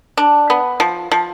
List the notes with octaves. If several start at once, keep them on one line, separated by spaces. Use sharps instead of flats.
D4
B3
F3
F3